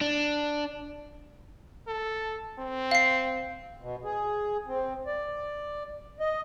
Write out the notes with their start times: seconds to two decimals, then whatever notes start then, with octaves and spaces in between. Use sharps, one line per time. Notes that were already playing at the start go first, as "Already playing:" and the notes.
0.01 D4
1.87 A4
2.59 C4
2.91 F5 C7
3.82 B2
4.04 G#4
4.67 C4
5.07 D5
6.20 D#5